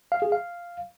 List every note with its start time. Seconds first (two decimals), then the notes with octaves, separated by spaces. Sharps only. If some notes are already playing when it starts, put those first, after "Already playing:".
0.12 F5
0.22 G#4
0.32 F5